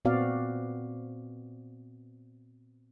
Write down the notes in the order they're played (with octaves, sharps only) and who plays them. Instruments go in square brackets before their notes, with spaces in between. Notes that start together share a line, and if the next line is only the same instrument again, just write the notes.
[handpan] A#2 B3 C4 F#4 D5 F5